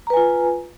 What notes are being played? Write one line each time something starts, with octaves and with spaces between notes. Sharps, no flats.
F4 B4 G#5 A#5